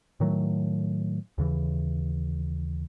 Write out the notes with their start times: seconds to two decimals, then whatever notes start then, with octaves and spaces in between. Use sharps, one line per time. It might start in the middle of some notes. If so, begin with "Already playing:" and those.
0.20 A2 D#3 F#3 A3
1.38 D#2 C#3 E3